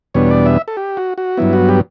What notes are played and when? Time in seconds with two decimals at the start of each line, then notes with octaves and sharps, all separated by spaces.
0.14 E2 B2 G3 B3 D4 C#5
0.31 D5
0.46 E5
0.68 A4
0.77 G4
0.97 F#4
1.18 F#4
1.37 G2 F#3 B3 E4
1.53 F#4
1.69 G4